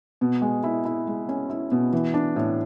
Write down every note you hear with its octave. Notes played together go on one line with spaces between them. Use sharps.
B2
G#3
E4
E4
G#3
C#4
E4
B2
E3
D4
A2